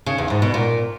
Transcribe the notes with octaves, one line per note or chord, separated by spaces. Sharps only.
C#3
E2
G#2
B2
A#2